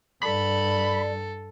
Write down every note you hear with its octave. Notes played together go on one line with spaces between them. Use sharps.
G2 A4 D5 B5